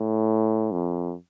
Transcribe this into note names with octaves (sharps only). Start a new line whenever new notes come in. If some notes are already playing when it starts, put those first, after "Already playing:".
Already playing: A2
F2